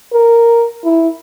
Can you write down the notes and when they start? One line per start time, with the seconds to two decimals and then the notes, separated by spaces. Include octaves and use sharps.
0.13 A#4
0.85 E4